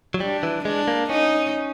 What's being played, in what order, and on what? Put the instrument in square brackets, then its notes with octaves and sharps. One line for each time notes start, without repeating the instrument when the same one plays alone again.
[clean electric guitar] F#3
[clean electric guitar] G3 [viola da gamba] D4
[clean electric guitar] E3
[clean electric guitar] G#3 [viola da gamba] D4
[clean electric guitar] A#3
[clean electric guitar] C#4 [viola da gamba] D#4